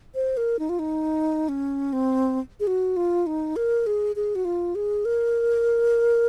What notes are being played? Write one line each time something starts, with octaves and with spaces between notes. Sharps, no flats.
C5
A#4
D#4
F4
D#4
C#4
C4
G#4
F#4
F4
D#4
A#4
G#4
G#4
F#4
F4
G#4
A#4